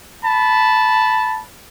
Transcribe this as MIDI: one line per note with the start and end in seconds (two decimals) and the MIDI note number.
0.24 1.41 81
0.24 1.41 83